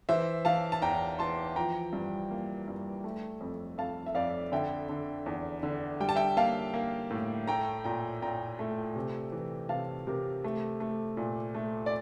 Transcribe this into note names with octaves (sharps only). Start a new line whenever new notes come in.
E3 C5 E5
E3 F5 A5
A5
E2 G5 A#5
E3 A5 C6
F3 G5 A#5
G2
A#3
G2
A3
F2
F2 F5 A5
E5
F2 D5 F5
D3 E5 G5
D3
E2
D3
G3 G5
A5
E5 G5
A#3 F5 A5
A#3
A2
A3 G5 A#5
A#2 G5 A#5
A#2 G5 A#5
A3
C3
E3
C3 F5 A5
C3 G4 A#4
A3
A3
A#2
A3
D5